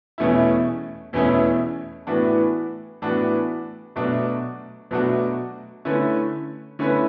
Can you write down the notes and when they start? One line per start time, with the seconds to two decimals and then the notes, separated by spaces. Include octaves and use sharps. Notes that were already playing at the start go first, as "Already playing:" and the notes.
0.18 E2 B2 A3 C#4 E4
1.13 E2 B2 A3 C#4 E4
2.07 A2 E3 B3 D4 F#4
3.02 A2 E3 B3 D4 F#4
3.96 B2 F#3 A3 D4 F#4
4.91 B2 F#3 A3 D4 F#4
5.85 D3 A3 C#4 E4 B4
6.79 D3 A3 C#4 E4 B4